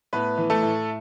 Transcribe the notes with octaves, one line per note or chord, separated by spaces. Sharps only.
A2 B3 B4
E3
A3 A4
A2